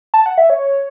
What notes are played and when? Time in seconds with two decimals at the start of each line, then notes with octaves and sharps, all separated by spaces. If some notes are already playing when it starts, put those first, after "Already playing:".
0.14 A5
0.26 F#5
0.38 E5
0.50 C#5